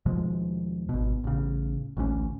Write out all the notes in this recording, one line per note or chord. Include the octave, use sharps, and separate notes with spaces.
D#2 B2 F3 G#3
G#1 B2
A1 C#3
A1 D2 E3 C#4